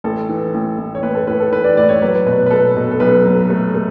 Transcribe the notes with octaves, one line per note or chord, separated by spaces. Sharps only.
A1 A4
E3
A1
A1
C#5
A1 B4
A4
A2 B4
A4
E3 B4
D5
A2 D5
C#5
F#3 B4
B2 B4
B4
B2 A4
B2
A4
B1 B4
F#3
A3
A3